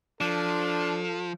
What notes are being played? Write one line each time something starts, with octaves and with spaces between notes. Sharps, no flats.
F3 D4 A4